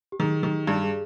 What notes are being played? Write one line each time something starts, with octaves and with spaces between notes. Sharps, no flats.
G4
D#3 G#4
D#3 G4
G2 G4
G#4